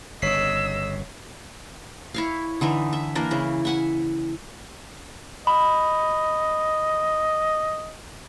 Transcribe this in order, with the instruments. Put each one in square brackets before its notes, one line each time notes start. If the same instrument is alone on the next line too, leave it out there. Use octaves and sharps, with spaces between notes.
[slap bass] G1 C#3 [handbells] C#5 B6 C7 [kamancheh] D#5 E6
[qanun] E4 C#5 F5
D3 E3 D#4 E5
E5
E3 A#3 D4 A#4
C#3 E4
E5 F#5 G#5
[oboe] D#5 [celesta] B5